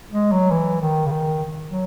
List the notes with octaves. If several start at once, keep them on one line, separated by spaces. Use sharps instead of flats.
G#3
F#3
E3
D#3
C#3
D#3
F#3